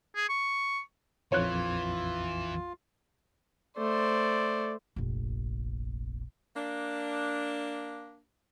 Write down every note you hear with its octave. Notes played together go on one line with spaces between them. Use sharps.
G#4
C#6
A#1 F2 E3 F4 C#5 F#6
A3 C5 D5
F1 A#1
A#3 D4